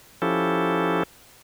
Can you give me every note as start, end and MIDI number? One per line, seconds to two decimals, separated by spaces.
0.22 1.03 53
0.22 1.03 61
0.22 1.03 64
0.22 1.03 67
0.22 1.03 69